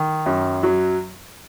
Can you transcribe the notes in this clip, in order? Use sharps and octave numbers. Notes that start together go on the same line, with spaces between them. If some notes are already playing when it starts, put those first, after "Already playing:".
Already playing: D#3
F#2
F#3